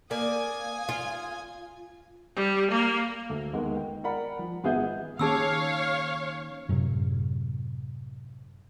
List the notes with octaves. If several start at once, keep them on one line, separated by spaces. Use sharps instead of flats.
A#3 D5 F5 G#5 D#6
F4
G3
A#3
D2 A4
D#2 D#3 G#3 B3
G5
A#4 D5 F#5 B5
F3
G#1 B3 G#4 E5 G6
D#3 A#3 C#4 G#4 C#5 F5 A5 E6
F#2 A2 C3 F#3